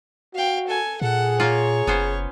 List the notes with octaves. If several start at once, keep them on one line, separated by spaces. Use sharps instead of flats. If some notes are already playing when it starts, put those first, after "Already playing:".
F#4 F5 G5
A4 G#5
A#2 G#4 A4 F#5
A#3 F4 C#5
F#1 B3 C#4 C5